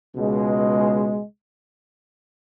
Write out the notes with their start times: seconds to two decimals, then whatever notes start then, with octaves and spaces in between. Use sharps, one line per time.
0.15 C#2 B2 G#3